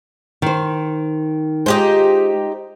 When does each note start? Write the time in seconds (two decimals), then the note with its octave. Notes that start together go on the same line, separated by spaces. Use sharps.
0.42 D#3 C5
1.66 G#3 D#4 F4 G4 C5